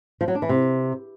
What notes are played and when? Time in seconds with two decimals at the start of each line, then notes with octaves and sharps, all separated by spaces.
0.21 F3
0.28 F#3
0.35 D4
0.42 E3
0.49 C3